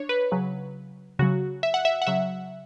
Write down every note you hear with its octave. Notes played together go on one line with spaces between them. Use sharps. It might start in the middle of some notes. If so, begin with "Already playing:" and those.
Already playing: D4 C#5
B4
C#3 F#3
C#3 F#3 F#4
E5
F#5
E5
F#5
C#3 F#3 E5